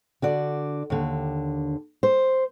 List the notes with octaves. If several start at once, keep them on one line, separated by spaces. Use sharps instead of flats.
D3 F#4 D5
D#2 D3
C5